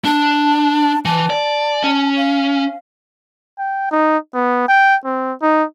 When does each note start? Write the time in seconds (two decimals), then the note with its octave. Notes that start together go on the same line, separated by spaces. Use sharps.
0.05 D4 A5
1.05 E3 A5
1.30 D5
1.84 C#4
2.17 F5
3.59 G5
3.91 D#4
4.34 B3
4.68 G5
5.04 C4
5.42 D#4